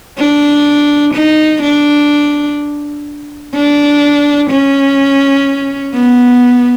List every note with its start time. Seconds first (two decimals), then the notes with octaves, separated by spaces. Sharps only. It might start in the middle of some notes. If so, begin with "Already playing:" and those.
0.18 D4
1.14 D#4
1.62 D4
3.55 D4
4.50 C#4
5.94 B3